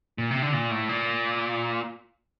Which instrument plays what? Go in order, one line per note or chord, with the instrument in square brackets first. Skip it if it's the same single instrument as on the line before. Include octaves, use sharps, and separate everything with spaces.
[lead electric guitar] A#2
C3
D3
A#2
A2
A#2